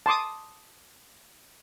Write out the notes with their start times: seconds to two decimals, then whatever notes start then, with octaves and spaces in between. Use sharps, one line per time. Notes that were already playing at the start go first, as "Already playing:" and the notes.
0.06 A5 C6 D6 D#6